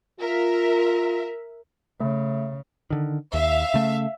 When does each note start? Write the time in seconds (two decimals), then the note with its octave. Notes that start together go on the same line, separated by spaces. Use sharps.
0.19 F4 A#4 E5
2.00 C#3 A3
2.90 D3 D#3
3.34 D#2 E5 F5
3.74 C#3 A3